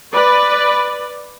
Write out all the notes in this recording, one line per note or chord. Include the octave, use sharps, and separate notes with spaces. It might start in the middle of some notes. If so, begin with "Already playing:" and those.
B4 D5